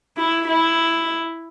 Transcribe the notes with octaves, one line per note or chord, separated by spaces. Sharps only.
E4
E4